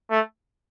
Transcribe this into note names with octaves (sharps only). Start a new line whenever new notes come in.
A3